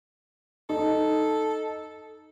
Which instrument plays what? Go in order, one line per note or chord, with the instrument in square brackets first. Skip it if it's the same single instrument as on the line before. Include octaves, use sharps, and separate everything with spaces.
[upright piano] D#4 [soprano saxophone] A4